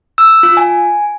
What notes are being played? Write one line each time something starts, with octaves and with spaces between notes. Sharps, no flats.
E6
F4
G#5